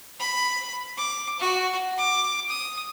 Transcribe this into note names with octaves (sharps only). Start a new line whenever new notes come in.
B5
D6
F#4
D6
D#6